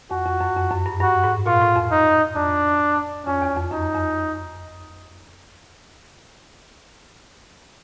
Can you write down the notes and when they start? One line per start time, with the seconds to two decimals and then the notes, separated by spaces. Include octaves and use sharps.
0.11 F2 F#4
0.26 F2
0.41 F#2
0.56 F2
0.71 F#2
0.86 G2
1.01 G2 F#4
1.24 G#2
1.46 A#2 F4
1.62 A2
1.76 F2
1.91 D#4
2.36 F2 D4
3.26 F2 C#4
3.42 E2
3.56 F2
3.71 F#2 D#4
3.94 F2